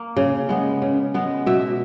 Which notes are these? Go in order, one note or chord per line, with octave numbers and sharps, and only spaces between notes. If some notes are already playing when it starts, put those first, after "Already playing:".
Already playing: A#3
C#3
G#3 B3
C#3
G#3 B3
B2 E5